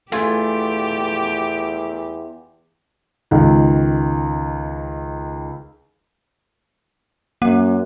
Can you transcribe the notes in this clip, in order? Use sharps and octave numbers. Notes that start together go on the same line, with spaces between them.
E2 A3 F4 G4 G#5
C#2 D#3
F#2 A#3